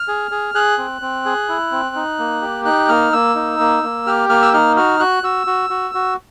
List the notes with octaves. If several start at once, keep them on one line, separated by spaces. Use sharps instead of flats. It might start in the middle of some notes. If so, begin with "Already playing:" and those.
Already playing: F6
G#4
G#4
G#4 F#6
C4
C4
G#4
E4
C4
D#4
A#3
G4
D#4 F#6
A#3 F6
A#3 E6
D#4
A#3
A#3
G4 F6
A#3 F6
E6
D#4 F6
F#4 F6
F#4 F#6
F#4 E6
F#4
F#4
F#4